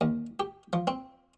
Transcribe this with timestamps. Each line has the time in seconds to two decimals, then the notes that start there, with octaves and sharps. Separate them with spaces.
0.01 D#2
0.40 G4
0.73 F3
0.87 C4